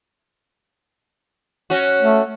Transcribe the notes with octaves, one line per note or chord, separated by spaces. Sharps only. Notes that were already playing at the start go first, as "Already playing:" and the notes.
C#4 F#4
A3